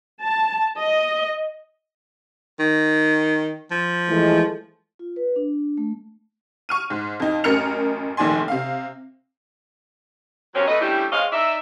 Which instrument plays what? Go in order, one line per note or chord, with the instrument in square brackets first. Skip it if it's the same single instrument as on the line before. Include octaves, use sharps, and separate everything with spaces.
[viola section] A5
D#5
[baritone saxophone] D#3
F3
[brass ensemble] E3 G#3 A3
[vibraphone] F4
B4
D4
A3
[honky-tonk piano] C#6 F6 D#7
G#2
F2 D#4
A1 F#2 A#4 F6 C#7 F7
F1 A#1 D#3 D5 G#5 C6
C3 F5
[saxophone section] C3 F#3 A#3 C4 C#4
A3 B4 D#5
G3 A3 C#4 D4 E4 G4
G#3 C4 C#5 D#5 F5
D#4 D5 E5